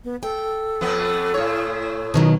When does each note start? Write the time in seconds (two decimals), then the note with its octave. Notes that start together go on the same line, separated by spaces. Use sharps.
0.04 B3
0.23 A4 G5
0.81 F2 B3
1.34 A2 C#5
2.14 B2 D#3 F#3